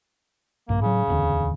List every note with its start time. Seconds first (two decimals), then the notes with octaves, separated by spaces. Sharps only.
0.69 A#1 G2 A#3
0.82 A2 C#3 F#3
1.08 D1 E2 D3